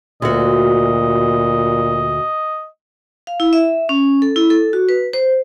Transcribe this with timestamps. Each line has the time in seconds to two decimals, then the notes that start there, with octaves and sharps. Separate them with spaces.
0.22 D2 A#2 F#4 D#5
3.27 F5
3.40 E4
3.53 E5
3.89 C#4
4.22 A4
4.36 E4
4.50 A4
4.73 F#4
4.89 B4
5.13 C5